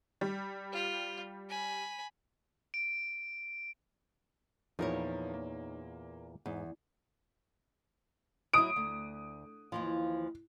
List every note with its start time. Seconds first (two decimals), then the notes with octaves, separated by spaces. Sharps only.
0.21 G3
0.72 F4
1.49 G#5 B5
2.74 D7
4.79 E2 A#2 F3 D#4 E4 A#4 C#5 F5
5.34 A#3
6.46 E2 G#2
8.54 F#3 E4 D#6 D7
8.76 D2
9.72 D#2 E3 F3